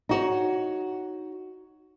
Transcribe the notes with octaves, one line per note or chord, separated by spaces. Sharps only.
D#4 F#4 C#5